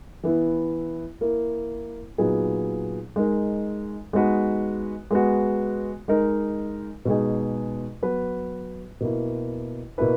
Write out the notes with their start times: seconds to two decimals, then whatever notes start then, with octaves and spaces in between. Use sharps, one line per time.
0.24 E3 B3 E4
1.21 A#3 E4 A#4
2.18 A#2 F#3 B3 D#4 G#4
3.16 G#3 D#4 A#4
4.13 G#3 B3 D#4 F#4 B4
5.11 G#3 B3 F#4
6.08 G#3 D#4 A#4
7.05 B2 G#3 D#4 G#4
8.02 F#3 B3 F#4 B4
9.01 B2 A#3 E4
9.98 B2 A#3 E4 B4